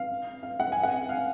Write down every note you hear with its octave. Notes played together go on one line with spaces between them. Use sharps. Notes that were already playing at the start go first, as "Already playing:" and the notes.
Already playing: F5
F5
F#5
G#5
F#5
F5